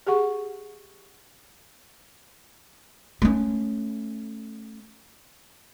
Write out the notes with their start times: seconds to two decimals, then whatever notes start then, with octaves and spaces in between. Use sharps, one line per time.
0.07 G4 G#4 F#5 C#6
3.22 A3 C#4